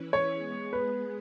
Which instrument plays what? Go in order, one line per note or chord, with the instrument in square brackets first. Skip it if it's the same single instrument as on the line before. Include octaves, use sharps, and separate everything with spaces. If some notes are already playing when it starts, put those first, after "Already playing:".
Already playing: [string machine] E3 C#4 E4 B4
[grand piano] C#5
[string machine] G#3 B3 G#4
[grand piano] B4